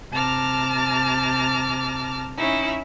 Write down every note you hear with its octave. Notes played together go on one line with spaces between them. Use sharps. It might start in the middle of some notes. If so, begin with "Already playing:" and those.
C3 A5 A#5 D6 F6
C#4 D#4 E4